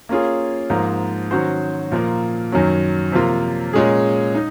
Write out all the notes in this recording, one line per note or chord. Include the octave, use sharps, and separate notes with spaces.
A#3 C#4 F4 G#4
G#2 F3 A#3
D#3 F#3 C#4 F#4 C5
A#2 F3 A#3
F#2 D#3 F#3 C#4
C3 F3 A#3 F4
A#2 G#3 C#4 G#4
D#4